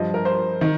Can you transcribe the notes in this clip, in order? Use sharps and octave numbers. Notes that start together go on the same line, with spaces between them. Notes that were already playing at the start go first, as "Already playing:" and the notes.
Already playing: G2 F3 D#5
A#4
C5
D#3